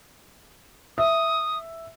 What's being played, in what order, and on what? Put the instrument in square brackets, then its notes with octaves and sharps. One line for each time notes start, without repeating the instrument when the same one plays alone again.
[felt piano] E5 [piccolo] D#6